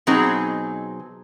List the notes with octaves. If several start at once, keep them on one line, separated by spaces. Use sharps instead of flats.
B2 F#3 C4 D#4 G#4